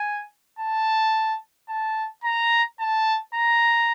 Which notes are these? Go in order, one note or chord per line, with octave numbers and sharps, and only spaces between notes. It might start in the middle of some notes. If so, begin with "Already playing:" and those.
Already playing: G#5
A5
A5
A#5
A5
A#5